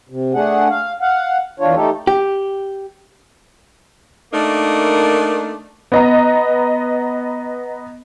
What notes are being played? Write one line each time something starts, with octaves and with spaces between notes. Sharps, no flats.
C3
A3 D4 G#4 F#5
F5
F5 F#5
E2 D4 F4 C#5
A3 D#4 G4 A4
G4
A3 A#3 D4 D#4 A#4
B3 D#5 A#5